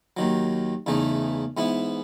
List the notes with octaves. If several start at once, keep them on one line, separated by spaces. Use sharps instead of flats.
D#2 D#3 F#3
E2 C#3 E3 A3 D#4
G#2 E3 B3 E4